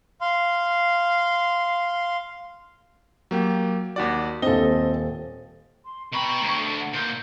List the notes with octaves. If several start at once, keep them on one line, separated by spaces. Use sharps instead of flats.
F5 C6
F#3 A#3 G4
D#2 F#4 D5
D#1 C4 A4 D#5 G7
C6
B2 G5 A#5 B5 C#6
D2
A4
F#5
A#2 D#4 G6